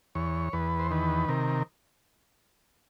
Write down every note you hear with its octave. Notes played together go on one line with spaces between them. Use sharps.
E2 C#5
E2 B4
C5
D#3 B4
C3 A#4